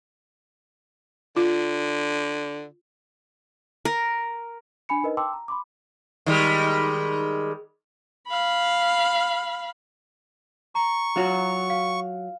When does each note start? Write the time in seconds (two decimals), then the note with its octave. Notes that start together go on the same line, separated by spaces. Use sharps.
1.36 D3 F4
3.85 A#4
4.89 D4 G#5 B5 C#7
5.03 D#4 A#4 B4 D#5
5.17 G5 A5 C6 D6 E6
5.33 A#5
5.48 B5 C6 D6
6.26 D#3 G3 G#3
8.28 F5 B5
10.75 A#5 C#6
11.16 F#3 F4 F#4
11.70 F5